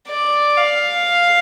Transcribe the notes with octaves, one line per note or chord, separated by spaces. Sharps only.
D5
F5